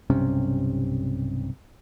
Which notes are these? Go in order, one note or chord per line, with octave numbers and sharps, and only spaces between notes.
B1 G2 C3 C#4